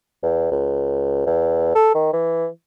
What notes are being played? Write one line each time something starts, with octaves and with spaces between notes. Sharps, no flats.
E2
C#2
E2
A4
D#3
E3